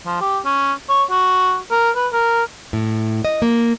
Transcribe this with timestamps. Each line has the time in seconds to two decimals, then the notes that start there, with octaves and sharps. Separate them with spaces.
0.06 F3
0.21 G4
0.45 C#4
0.89 C#5
1.11 F#4
1.71 A#4
1.96 B4
2.13 A#4
2.73 A2
3.25 D#5
3.42 A#3